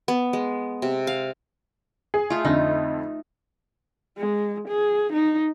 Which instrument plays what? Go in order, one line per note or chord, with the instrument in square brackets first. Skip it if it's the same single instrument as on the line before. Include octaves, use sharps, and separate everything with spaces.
[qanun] B3
G#3
C3
F5
[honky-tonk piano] G#4
[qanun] A3 F4
[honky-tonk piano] F2 D3 [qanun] D#4
[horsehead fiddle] G#3
G#4
D#4